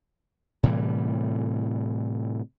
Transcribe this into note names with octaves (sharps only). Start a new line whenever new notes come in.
A2 C3 E3 G3